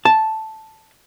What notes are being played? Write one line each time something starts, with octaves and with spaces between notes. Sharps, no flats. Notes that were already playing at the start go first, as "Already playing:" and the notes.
A5